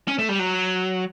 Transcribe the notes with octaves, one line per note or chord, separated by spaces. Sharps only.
C#4
A3
G3
F#3